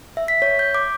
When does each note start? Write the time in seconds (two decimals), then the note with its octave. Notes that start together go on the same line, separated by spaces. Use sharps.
0.17 E5
0.28 B6
0.42 C#5
0.59 G6
0.75 D6